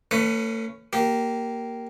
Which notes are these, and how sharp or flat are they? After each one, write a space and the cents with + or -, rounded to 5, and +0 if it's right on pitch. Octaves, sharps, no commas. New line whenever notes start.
A3 +45 C#4 +0 B4 +20
A#3 +0 G4 -15